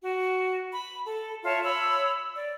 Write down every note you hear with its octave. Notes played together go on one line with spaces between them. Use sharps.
F#4
B5
A4
F4 C#5 E5 A5
C#5 B5 E6
D5